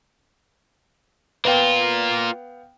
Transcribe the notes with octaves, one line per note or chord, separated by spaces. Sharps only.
A#3 B3 F4 F5 G5